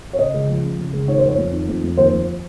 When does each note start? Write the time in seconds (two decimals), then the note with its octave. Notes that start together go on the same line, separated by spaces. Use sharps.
0.13 C#5
0.19 C#3 D#5
0.34 C#2
0.49 F3
0.64 C#3
0.79 C#3
0.93 C#2
1.08 D#3 C#5
1.18 F2 C5
1.29 C#5
1.38 F2
1.53 D#3
1.68 F2
1.83 F2
1.97 D#2 C5
2.12 F3